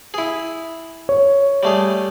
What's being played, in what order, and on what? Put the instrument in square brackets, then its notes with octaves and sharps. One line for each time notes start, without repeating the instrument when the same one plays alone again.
[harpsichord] E4 G#4
[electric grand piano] C#5
[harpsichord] G3 A3 G#4